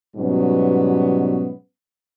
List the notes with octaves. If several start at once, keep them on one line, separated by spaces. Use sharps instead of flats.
G#2 B2 F#3 G3 B3 C#4